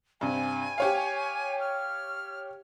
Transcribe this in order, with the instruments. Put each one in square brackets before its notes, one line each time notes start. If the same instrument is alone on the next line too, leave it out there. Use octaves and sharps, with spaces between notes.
[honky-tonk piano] G2 C3 [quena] G#5
[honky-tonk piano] G4 C#5 F5
[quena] F6